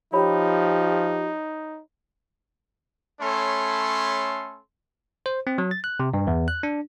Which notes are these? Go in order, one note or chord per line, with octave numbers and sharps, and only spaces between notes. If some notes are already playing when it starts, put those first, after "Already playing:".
F3 D#4 G4 C#5 B5
A3 C#4 A4 C#5 B5 C6
C5
C4
F#3
A6
F#6
C3
G2
E2
F#6
D4